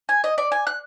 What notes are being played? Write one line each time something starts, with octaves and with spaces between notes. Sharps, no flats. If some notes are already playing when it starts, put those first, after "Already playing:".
G#5
D#5
D5
G#5
F#6